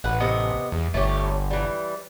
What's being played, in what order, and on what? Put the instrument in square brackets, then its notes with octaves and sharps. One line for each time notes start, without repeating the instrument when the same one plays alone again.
[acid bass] A1 [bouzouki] B4 F#5
[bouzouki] C3 B3 D#5
[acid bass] E2
[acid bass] G1 [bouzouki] A3 C#4 G4
[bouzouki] E3 G3